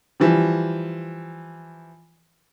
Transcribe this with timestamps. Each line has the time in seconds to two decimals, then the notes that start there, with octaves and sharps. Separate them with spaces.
0.20 E3 F3 G3